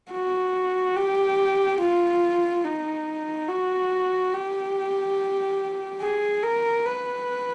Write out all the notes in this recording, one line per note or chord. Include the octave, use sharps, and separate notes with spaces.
F#4
G4
F4
D#4
F#4
G4
G#4
A#4
B4